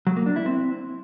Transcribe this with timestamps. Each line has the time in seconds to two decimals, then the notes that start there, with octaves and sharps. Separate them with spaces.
0.07 F#3
0.16 A#3
0.26 D4
0.36 E4
0.46 C4